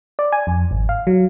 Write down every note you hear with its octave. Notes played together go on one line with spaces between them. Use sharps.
D5
G#5
F2
G#1
F5
F#3